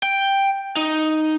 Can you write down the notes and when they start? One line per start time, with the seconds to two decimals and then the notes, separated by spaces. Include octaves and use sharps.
0.03 G5
0.77 D#4